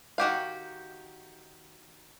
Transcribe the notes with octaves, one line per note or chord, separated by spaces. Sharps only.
D#3 F#4 G4 F5